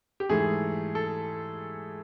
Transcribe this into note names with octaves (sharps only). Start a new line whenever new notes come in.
G4
G#2 E3 A3 G#4
A4